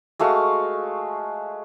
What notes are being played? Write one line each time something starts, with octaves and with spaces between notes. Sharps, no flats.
G#3 A3 F#4 F5